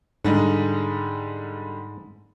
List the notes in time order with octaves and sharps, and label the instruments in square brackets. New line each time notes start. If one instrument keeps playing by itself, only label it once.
[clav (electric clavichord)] G#2 [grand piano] D3 G3 G#3